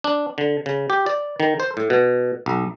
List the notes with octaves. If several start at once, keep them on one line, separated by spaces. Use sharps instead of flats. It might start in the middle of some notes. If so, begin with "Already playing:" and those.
D4
D3
C#3
G4
D5
D#3
C5
A2
B2
B1